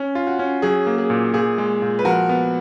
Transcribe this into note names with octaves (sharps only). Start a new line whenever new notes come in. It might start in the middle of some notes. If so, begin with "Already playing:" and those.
Already playing: C#4
F4
F#4
C#4
F#3 G#4
A#3
G#4
A#2
A#2 G#4
G#3
A#2
B4
F3 F#4 A#4
B3